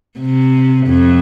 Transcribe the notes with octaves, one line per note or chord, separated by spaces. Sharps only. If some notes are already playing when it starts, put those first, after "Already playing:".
C3
F2